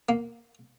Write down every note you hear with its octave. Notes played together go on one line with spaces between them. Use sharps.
A#3